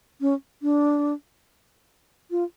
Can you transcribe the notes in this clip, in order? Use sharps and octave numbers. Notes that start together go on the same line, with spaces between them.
C#4
D4
F4